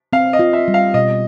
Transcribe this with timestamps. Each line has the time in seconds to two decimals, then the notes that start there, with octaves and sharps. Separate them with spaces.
0.13 C4 F5
0.33 D#5
0.39 F4
0.53 E5
0.68 G3
0.74 F5
0.94 B2 D#5